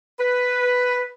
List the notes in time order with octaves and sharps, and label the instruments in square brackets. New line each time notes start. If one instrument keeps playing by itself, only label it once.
[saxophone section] B4